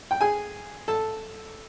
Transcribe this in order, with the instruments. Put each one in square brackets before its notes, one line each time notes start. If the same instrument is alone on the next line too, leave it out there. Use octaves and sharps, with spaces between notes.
[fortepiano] G5
G#4 G#5
A4 A5